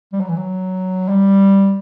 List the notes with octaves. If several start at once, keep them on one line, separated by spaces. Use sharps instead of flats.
G3
F#3
E3
F#3
G3